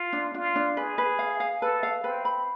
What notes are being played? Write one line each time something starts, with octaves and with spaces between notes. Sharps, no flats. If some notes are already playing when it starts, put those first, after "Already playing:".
Already playing: F4
D4
D4 F4
D4
G#4 B4
B4
F5
F5
A4 B4
F5
C4 B4
B5